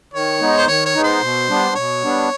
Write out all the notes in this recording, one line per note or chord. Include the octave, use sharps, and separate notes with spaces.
D#3 C#5
G#3 B3 D#4
C5
D#3 C#5
C#5
G#3 B3 D#4
C5
B2
G3 B3 D4
B2 C#5
G3 B3 D4